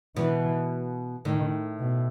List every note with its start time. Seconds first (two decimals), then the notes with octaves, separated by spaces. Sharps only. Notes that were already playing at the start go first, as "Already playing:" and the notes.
0.16 B2 E3
1.25 A2 D#3
1.80 B2